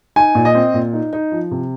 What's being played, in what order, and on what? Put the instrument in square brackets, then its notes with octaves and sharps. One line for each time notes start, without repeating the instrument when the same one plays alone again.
[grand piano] D#4 G#5
A#2
D#5
C4
A#2
D#4
D#4
F3
C3